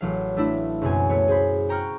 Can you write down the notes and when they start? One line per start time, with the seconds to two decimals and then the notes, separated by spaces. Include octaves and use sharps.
0.01 A1 F#3 F5
0.37 A3 D4 E4
0.81 C#2 F#2 B2 C4 G#5
1.09 A3 B3 C#5
1.28 G#4 C5 B5
1.69 G5 A#5 C#6 F6 F#6